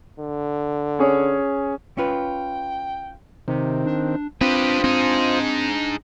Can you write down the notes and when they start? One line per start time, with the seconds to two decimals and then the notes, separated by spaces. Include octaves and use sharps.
0.20 D3
0.99 C#4 G#4 C#5
1.97 C#4 F4 B4 G5
3.48 C3 D#3 C4
3.86 D4
4.41 C4 D4 F4 G4 B4 C5 D#6
4.84 C4 D#4 G#4